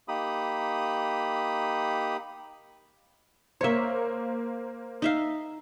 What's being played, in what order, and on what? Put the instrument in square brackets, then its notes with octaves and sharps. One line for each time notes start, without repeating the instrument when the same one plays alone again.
[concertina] A#3 D#4 G4 B5 D#6
[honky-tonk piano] A#3 C5 [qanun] C#5 E5
[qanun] D#4 E5 F5